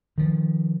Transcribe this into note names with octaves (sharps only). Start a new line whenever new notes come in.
D#3 F3